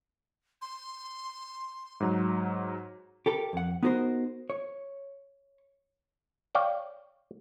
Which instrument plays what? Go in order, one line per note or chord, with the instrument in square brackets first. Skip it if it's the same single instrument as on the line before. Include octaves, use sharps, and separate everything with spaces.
[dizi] C6
[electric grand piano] G#2 F#3 A#5
[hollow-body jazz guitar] G4 A4 A#4
F2 F#5
B3 D#4 F#4 A4 A#4 C5
C#5
[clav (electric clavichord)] C#5 D5 F5 G5